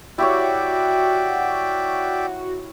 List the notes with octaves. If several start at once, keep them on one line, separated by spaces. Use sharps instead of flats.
E4 F#4 G4 C#5 D5 E5 G5